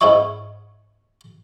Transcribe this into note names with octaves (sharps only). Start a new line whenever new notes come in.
G#2 C#4 D#4 E4 C#6